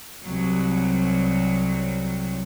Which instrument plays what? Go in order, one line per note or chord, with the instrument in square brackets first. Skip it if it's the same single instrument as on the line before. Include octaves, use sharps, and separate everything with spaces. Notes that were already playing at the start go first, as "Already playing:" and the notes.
[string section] C2 F#3